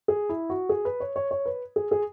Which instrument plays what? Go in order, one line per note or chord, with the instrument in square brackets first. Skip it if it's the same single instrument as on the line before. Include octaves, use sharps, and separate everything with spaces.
[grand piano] G#4
E4
F#4
G#4
B4
C#5
C#5
C#5
B4
G#4
G#4